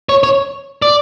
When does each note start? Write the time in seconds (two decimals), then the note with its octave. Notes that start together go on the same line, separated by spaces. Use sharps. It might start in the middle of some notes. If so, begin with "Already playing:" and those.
0.09 C#5
0.23 C#5
0.82 D5